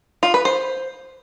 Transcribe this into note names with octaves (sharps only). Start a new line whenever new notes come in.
F4
B4
C5